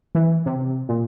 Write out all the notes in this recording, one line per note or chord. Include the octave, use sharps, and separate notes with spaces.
E3
C3
A#2